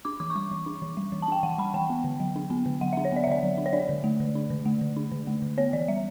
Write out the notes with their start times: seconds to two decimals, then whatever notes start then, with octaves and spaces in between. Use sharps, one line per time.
0.05 D4 D6
0.20 E3 D6
0.30 C#6
0.36 G3 D6
0.51 E3
0.66 D4
0.82 E3
0.97 G3
1.12 E3
1.22 A5
1.28 D4 G5
1.43 E3 F#5
1.58 G3 B5
1.74 E3 G5
1.90 B3
2.04 D3
2.20 F#3
2.36 D4
2.50 B3
2.66 D3
2.81 F#3 F#5
2.93 E5
2.97 D4
3.05 C#5
3.12 B3 D5
3.24 E5
3.27 D3 D5
3.43 F#3
3.58 D4
3.66 C#5
3.73 D4 D5
3.89 D3
4.04 A3
4.20 D3
4.35 D4
4.50 D3
4.66 A3
4.81 D3
4.96 D4
5.12 D3
5.27 A3
5.42 D3
5.58 B3 C#5
5.73 E3 D5
5.88 G3 E5